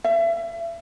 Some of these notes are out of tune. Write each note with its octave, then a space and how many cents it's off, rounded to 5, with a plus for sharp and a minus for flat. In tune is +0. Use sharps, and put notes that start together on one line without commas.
E5 +35